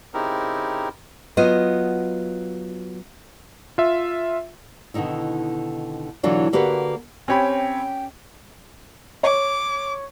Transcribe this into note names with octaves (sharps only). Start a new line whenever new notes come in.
C#3 C4 D#4 E4 G4 A#4
F#3 B3 F4 D#5
F4 E5
B2 D3 D#3 D#4 E4
B2 D3 E3 F#3 D4 F4
D3 A#3 F#4 G4 B4
C4 C#4 G4 C#5 G5 B5
C#5 D6